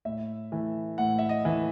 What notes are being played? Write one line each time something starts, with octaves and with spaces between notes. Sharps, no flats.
A2 E5
E3 A3
A2 F#5
E5
D#5
E3 A3